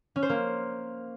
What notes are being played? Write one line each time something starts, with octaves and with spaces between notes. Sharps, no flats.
C#4
C5
A#3